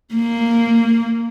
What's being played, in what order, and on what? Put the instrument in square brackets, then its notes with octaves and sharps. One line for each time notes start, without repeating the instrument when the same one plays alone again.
[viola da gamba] A#3